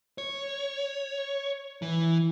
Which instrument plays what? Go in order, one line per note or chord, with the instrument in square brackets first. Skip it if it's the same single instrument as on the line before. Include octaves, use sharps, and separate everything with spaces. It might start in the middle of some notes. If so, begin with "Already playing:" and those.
[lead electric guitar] C#5
E3